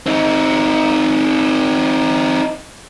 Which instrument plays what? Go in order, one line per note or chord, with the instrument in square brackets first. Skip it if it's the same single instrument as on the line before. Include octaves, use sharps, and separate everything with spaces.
[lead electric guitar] C4 D#4